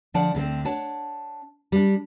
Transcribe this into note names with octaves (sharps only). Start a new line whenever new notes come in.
D3 F3 D4 D5 F#5 A5
D2 D3 G#3 C4
D4 C#5 F#5 A5
G3 D4